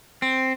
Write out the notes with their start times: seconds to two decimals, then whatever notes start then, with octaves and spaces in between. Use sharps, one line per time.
0.22 C4